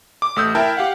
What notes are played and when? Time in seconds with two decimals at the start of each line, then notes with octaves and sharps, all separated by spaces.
0.22 D6
0.36 A1 A3 D#6 E6 G6
0.55 E4 A#4 E5 G5 A5
0.77 G4 F5 F#5